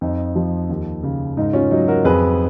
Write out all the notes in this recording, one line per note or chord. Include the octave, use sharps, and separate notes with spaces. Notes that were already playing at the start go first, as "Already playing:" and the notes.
F2 D#4
F3
D#2
C#3
G#2 D#4
C#4 F4
F#3 D#4
F#4 A#4
F2 G#4 B4